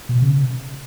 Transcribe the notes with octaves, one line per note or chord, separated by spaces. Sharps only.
B2
C#3